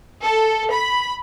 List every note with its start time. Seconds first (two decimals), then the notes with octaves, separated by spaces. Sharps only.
0.22 A4
0.72 B5